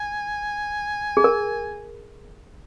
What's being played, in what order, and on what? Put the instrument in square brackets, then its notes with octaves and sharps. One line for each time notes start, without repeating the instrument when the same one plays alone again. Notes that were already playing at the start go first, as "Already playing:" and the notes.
Already playing: [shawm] G#5
[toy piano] G#4
A#4